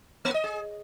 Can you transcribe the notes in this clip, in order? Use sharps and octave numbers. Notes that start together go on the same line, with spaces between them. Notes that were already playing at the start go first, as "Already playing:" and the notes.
A#3
D#5
G#4